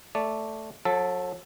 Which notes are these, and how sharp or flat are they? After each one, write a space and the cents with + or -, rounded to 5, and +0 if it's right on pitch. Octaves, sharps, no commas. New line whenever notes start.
A3 +0 D5 -10
F#3 -40 A4 +0